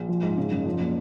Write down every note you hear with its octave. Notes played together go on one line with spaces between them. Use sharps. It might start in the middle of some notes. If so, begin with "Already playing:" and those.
Already playing: A#1
F3
G#2
C#3
F#1
F3
A#2